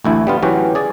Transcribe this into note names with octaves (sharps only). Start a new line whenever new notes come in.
A1 D2 E4
G3 B3 F4
E3 F#3 C#4 F#4 G4
G#4 D5